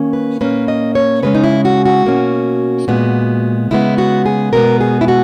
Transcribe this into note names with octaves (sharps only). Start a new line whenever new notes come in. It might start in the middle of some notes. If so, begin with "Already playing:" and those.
Already playing: D#3 A#3 C#4
B4
A#2 A#3 C#4 B4
D#5
C#5
C#3 G#3 C#4 B4
D#4
E4
F#4
F#4
B2 A#3 C#4
A#2 G#3 B3
C#3 G#3 B3 E4
F#4
G#4
B2 G#3 B3 A#4
G#4
E4
F#4